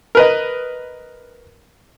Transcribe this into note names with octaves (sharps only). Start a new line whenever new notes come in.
A#4 B4 D#5